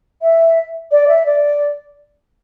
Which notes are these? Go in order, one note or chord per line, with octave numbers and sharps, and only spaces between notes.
E5
D5
E5
D5